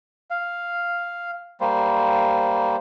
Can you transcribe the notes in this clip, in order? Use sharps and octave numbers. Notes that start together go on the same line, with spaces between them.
F5
G3 A#3 C5